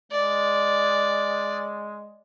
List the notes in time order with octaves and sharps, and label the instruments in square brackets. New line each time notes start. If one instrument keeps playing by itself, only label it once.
[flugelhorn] G#3 [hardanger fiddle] D5